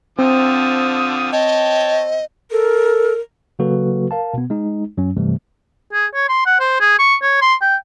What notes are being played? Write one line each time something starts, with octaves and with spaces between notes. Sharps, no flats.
D3 F3 C4 D#6
C#5 D#5 G5 A5
A4 A#4
C#3 F#3 A#3 F#4 A4 B4
A#4 F5 A5
B2 B3
G#3 D#4
F#2 F#3 C#4
G2 C3 E3 G3 A3
G#4
C#5
C6
F#5
C5
G#4
C#6
C#5
C6
G5